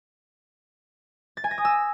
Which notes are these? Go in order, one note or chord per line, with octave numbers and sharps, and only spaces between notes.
A6
G#5
A#6
D#6
E6